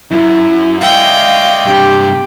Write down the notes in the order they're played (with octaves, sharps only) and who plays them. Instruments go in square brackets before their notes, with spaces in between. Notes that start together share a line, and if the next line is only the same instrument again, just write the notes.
[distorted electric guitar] F#2 [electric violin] E4
[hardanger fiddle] G#3 G5 [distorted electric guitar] D5 E5 [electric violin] F5
[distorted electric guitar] G2 C3 [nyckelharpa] G4